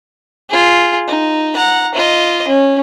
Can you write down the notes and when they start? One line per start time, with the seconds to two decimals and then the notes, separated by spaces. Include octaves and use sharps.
0.50 F4 G#4
1.08 D#4
1.55 F#5 A#5
1.94 F4 D#5
2.48 C#4